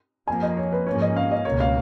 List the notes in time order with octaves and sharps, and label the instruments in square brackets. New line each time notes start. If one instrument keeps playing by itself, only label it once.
[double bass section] F2 F3 A#3 [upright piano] G#5
[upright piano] D#5
C#5
B4
[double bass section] G#2 F3 A#3 C#4 [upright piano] C#5
[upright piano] D#5
F5
D#5
[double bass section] C#2 B2 A#3 [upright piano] C#5
[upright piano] F5